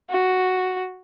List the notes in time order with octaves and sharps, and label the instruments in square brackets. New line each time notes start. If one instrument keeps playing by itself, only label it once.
[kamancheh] F#4